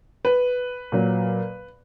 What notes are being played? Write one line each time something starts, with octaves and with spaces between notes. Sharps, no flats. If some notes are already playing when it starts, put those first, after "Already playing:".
B4
A#2 F#3